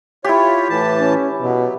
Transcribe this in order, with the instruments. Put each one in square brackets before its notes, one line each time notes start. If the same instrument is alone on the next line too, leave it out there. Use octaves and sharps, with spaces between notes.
[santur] E4 G4 [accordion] F4 C#5
[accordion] A2 E3 A5
[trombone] C#4
[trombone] B2 [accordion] F#3